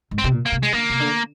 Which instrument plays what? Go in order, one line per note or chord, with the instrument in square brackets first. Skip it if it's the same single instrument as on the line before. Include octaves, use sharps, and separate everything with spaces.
[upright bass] G#2
[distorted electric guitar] C4
[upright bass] C3
A#2
[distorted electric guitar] A#3
[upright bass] C3
[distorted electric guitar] G#3
[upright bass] D3 [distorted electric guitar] A#3
[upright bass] C3
D3